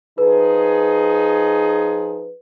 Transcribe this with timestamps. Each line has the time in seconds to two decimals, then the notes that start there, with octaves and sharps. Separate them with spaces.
0.18 F3 D#4 G#4 B4